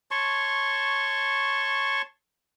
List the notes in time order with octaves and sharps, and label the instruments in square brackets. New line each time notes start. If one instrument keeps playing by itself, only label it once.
[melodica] C#5 A5 C6 C#6